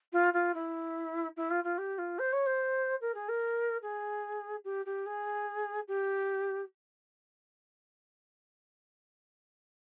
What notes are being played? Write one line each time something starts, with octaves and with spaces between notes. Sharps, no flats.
F4
F4
E4
E4
F4
F4
G4
F4
C5
C#5
C5
A#4
G#4
A#4
G#4
G4
G4
G#4
G4